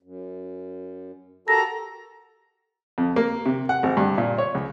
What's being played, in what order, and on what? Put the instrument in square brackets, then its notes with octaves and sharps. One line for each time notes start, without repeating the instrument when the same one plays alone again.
[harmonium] F#2
[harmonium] F#4 G4 A#4 [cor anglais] A4 [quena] A#5 [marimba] A#6
[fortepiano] F2
A#3
C3
F#5
G#1
G2
A#2
C#5
C#2